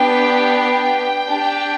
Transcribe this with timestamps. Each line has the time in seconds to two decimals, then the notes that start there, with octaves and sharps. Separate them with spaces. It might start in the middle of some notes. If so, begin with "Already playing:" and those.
Already playing: B3 D4 G4 G5
0.58 G5
1.27 D4 G4